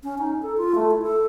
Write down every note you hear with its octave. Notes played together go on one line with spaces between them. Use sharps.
C#4
D#4
A4
F4
A3
E4
A4